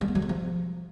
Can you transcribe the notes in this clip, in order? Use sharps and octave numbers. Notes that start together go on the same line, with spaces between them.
G3
A#3
F#3
G#3
F3